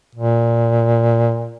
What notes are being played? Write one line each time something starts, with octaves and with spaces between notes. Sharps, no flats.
A#2